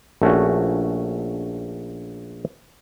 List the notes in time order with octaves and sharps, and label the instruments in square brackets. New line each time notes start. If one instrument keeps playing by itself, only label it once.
[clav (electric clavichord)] A#1 A3 C#4 F#4